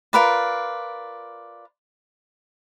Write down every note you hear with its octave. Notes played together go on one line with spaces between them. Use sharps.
F4 A#4 B4 D5